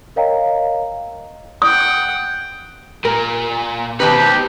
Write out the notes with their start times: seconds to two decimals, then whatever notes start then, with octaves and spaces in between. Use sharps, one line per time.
0.16 A#4 C#5 D#5 F5 G5 A#5
1.62 F#5 G5 D#6
3.05 A#2 A#4
4.00 B2 D#3 C4 D#4 G4 B4